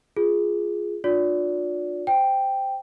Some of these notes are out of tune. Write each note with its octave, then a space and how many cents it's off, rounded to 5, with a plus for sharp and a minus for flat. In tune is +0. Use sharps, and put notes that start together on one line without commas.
F4 +0 G#4 +0
D4 +35 F4 +40 D5 -30
C5 +0 G5 +0